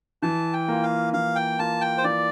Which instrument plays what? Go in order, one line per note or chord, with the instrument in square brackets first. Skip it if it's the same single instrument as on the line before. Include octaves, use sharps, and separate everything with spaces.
[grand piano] E3 [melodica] A5
[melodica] G5
[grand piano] A#3 F4
[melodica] F5
[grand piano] E3 [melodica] F5
[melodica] G5
[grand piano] A#3 F4 [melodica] A5
[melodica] G5
C5
[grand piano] E3 [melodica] D5